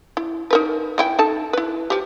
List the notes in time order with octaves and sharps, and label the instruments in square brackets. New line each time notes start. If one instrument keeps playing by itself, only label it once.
[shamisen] E4
D#4 A#4 B4
E3 E4 G5
D#4 A4 A5
E4 B4
F3 G4